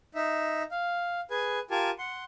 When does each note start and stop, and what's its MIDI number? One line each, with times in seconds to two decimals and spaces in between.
0.15 0.63 63
0.15 0.63 76
0.71 1.21 77
1.31 1.59 68
1.31 1.59 71
1.31 1.59 80
1.71 1.91 65
1.71 1.91 67
1.71 1.91 70
1.71 1.91 80
1.71 1.91 81
1.99 2.24 78
1.99 2.24 84